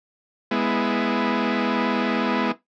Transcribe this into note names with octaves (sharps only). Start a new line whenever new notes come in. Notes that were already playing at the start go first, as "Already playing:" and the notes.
G#3 B3 E4